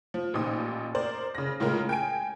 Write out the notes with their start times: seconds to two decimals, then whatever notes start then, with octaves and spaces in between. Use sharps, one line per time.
0.14 F3
0.34 A1 A#2 D#4 D#6
0.95 A#4 C5 D5
1.35 C#3 A#6
1.60 A2 C#3 G#3 F4 A#4
1.89 G5 G#5 D7